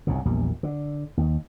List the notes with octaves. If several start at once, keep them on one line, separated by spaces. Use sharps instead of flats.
C2 G#2 C#3
A#1 E2 A#2 G3
D3
D#2